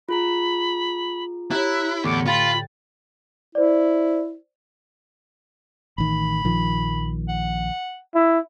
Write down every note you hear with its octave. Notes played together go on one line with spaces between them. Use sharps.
F4 G#4 A#5 B5
E4 G4 C#5 A#5 F#6
E2 A2 D3 A3 D6 G#6 C#7
F4 G5 B5 A6
E4 C5 D5
A1 D#3 B5
A#1 D#3 F3
F#5
E4